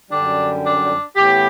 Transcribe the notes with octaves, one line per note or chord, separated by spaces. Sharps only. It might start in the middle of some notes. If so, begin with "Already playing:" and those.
F#2 D3 G3 D4
D4
A2 E3 B3 G4